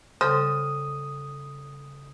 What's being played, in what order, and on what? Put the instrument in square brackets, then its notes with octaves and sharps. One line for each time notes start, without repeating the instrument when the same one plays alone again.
[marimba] C#3 G3 A4 [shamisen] C5 [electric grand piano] D#6